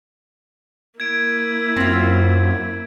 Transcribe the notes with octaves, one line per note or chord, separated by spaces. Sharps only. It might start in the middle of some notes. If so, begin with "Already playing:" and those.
A#3 E4 G#6 D7
F#2 C4 F4